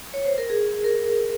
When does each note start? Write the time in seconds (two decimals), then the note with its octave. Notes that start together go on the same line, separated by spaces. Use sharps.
0.14 C#5
0.26 C5
0.38 A#4
0.50 G#4
0.84 A#4